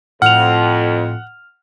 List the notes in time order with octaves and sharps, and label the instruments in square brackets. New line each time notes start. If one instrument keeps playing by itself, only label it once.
[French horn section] F2 [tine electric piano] A2 [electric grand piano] F#5 [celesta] F6 F7